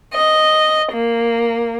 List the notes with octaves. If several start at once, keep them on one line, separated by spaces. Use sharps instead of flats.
D#5
A#3